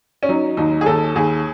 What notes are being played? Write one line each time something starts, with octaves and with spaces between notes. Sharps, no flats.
C#4
F#3 D#4
D#2 D#4
G#4
D#2 A4
D#2 G#4